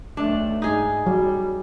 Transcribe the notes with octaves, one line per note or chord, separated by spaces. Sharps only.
B1 A3 D4
G#2 D#4 G#4
F#3 G3